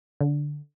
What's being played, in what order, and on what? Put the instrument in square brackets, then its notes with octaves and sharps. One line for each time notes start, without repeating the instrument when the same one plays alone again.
[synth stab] D3